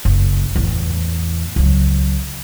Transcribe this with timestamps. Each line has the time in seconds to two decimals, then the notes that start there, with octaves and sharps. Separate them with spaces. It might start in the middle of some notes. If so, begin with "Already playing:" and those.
0.05 F#1
0.56 E2 A2
1.56 C#2 F#3